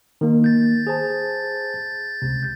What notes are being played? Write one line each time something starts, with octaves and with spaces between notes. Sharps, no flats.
D#3 A#3
G6 A6
G#4 C5 A5
C#2 C3